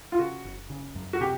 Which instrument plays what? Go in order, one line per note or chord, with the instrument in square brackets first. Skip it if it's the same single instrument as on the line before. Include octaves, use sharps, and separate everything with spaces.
[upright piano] F4
[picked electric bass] C#3 [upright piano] F#4
[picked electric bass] F#1
C#3
F#2
[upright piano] F#4
[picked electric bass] C3 [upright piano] G4